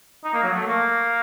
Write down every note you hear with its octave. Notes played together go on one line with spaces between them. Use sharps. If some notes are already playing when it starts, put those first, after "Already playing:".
D#4
A#3
F#3
A3
A#3